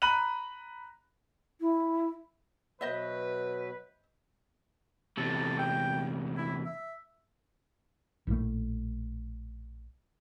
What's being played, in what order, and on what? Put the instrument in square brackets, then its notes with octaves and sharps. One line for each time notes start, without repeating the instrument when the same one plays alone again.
[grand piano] A#5 B5 F#6 D#7 F#7
[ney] E4
[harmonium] B2 F#3 [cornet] B4 [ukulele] C5 D#5 E5
[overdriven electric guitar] E2 C3 [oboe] A4
[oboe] G5
E4
E5
[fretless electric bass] A#1 A2 C#3 A3